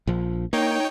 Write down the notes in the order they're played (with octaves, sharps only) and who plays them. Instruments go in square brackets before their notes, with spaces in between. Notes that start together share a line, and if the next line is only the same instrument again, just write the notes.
[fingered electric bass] A#1 F3
[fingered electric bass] A#3 [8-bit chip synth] D#4 C#5 G5